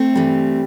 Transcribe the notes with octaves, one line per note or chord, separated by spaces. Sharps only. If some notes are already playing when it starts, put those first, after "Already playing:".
Already playing: A3 C4
G2 E3 G3